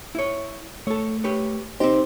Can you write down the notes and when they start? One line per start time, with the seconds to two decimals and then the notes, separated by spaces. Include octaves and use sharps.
0.15 E4 C#5
0.87 A3 A4 C#5
1.24 G4 B4 C#5
1.80 C4 D#4 G4 C5